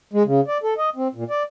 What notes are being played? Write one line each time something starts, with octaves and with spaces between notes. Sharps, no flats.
G#3
C#3
D5
A4
D#5
C4
A#2
D5